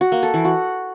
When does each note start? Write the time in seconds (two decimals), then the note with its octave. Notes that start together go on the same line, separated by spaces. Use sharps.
0.01 F#4
0.12 A#3
0.23 A4
0.34 E3
0.45 F#4